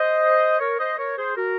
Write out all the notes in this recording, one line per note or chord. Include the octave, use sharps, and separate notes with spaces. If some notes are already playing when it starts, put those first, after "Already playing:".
Already playing: C5 D#5
A#4 C#5
C5 D#5
A#4 C#5
G#4 C5
F#4 A#4